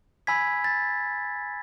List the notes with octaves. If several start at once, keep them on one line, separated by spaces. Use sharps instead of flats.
G#5 B5 E6 G#6 B6
A6